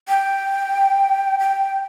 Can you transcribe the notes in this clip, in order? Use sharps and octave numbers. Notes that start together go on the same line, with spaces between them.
G5
G5